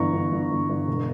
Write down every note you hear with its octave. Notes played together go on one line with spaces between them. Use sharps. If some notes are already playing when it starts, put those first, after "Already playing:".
Already playing: G1 E3 A#5 C#6
G1
G1
G1
G1
E1